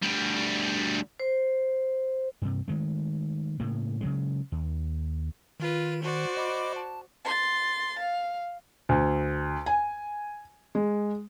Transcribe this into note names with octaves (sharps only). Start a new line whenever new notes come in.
D2 G3
C5
G2 C3
D#3 G#3 A3
A2 C#3 A#3
C#3 F#3 G#3
D#2
D#3 F4 B4
F#4 C5 D5
D#5 B5 D6
A5
C6 A6
F5
D2
G#5
G#3